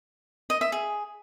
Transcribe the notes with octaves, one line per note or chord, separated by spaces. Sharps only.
D#5
E5
G#4